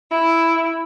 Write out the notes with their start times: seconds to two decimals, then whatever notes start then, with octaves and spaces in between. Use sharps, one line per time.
0.11 E4